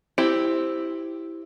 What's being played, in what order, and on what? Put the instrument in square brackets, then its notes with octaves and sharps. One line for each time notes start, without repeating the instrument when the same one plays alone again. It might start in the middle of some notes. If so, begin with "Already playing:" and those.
[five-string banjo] C4 E4 G4